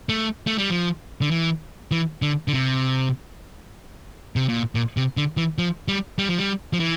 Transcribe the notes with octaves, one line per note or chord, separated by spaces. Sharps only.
A3
A3
G3
F3
D3
E3
E3
D3
D3
C3
C3
A#2
A#2
C3
D3
E3
F3
G3
G3
F3
G3
F3
E3